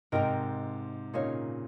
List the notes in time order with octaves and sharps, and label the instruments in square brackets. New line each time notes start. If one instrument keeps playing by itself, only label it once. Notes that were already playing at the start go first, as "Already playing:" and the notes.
[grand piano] G#2 C3 [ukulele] A#4 D#5 G5 A#5
[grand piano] A#2 C#3 [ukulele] D#4 A#4 C#5 F5